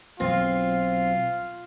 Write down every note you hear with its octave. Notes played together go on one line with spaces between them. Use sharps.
B1 C4 F4